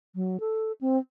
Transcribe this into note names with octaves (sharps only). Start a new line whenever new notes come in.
F#3
A4
C4